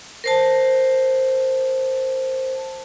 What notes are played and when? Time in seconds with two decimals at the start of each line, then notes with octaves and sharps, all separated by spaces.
0.24 A#4 C5 A5